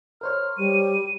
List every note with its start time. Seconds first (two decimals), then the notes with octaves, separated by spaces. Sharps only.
0.21 A#4 C5 C#5 F6
0.58 G3 D#7